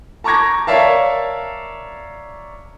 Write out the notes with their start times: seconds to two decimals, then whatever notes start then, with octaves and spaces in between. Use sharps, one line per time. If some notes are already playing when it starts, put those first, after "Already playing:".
0.24 A5 A#5 C#6 D6 G#6 A#6
0.67 A#4 C#5 D5 E5 F5 A5